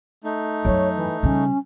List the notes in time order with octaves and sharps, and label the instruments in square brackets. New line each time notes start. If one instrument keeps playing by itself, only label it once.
[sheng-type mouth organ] A3 D#4
[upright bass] F#2 F#3 [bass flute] C#5
[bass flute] E3
[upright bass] C#3 G3 [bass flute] C#4